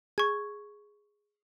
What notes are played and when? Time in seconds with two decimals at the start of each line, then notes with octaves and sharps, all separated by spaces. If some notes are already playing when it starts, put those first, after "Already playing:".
0.18 G#4 C#6 G#6